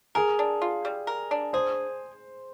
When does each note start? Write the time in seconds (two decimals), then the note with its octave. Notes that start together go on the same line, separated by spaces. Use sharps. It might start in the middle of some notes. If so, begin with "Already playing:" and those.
0.15 G#4 A#4
0.39 D4
0.62 F4
0.85 G3
1.07 A#4
1.31 D4
1.53 G#4 C5